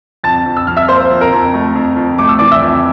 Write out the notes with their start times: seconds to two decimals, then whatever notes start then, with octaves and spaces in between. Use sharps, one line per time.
0.24 F2 A5 A6
0.46 F2
0.57 E6
0.67 F2 F6
0.77 E5 E6
0.88 A#3 C5 C6
1.11 F2
1.21 A#4 A#5
1.32 F2
1.54 A3
1.75 F2
1.97 F2
2.18 A3 D6
2.29 E6
2.39 E3 D5 D6
2.51 E5 E6
2.62 F2